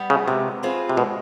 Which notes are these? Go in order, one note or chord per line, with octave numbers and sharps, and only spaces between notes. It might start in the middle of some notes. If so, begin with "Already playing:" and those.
Already playing: G3 B3
C#3
C3 G#3
C4 F4 G#4 B4
C3
B2 G#3